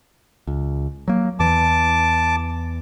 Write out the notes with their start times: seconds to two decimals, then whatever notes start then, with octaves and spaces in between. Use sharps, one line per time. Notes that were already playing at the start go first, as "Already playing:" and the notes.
0.47 C#2
1.08 F#3 A#3
1.40 E2 E3 A5 D6